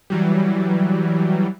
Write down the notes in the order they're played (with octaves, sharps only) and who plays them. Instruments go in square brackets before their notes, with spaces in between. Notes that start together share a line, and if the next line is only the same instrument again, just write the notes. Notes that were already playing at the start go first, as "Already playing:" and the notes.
[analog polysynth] E3 F#3 G3